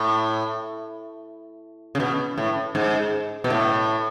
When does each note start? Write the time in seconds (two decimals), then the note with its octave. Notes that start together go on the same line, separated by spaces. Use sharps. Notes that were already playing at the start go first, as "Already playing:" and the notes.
Already playing: A2
1.95 C#3
2.00 B2
2.38 A2
2.75 G#2
3.44 B2
3.50 A2